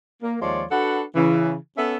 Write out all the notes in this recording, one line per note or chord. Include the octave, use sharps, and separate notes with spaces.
A#3
D#2 F3 G#3 F4 C#5 D5
D4 F#4 A4 B4 F#5
C#3 E3
B3 C#4 A4 E5